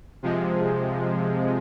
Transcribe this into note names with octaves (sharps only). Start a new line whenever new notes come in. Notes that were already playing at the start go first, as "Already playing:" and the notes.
C3 F3 G#3